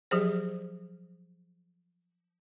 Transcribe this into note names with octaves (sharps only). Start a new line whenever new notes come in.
F3 F#3 G4 G#4 C5